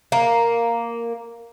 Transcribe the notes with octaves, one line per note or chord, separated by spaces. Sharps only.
A#3